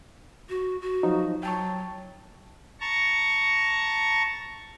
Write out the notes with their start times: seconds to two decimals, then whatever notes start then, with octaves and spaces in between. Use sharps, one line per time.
0.49 F#4
0.82 F#4
1.03 F3 F#3 D#4
1.43 F#3 G5 A5 C#6
2.80 A5 A#5 C#6